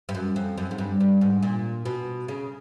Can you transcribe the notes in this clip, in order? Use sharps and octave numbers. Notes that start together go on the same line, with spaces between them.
G2
F#2
F2
F#2
G#2
G2
G2
G#2
A#2
B2
C#3